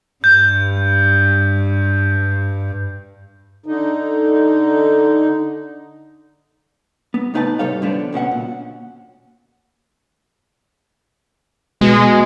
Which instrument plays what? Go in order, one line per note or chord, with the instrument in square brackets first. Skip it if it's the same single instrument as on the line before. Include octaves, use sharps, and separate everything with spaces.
[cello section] G2 [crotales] G6
[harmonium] D3 D#4
[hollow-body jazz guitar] B3
A2 C#3 D#4 B4 F#5 A5
G#2 C3 G3 A4 C#5 F5
D3 F3 B3 D4
C#2 B2 C#4 F#5
A#2
[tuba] B2 [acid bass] G#3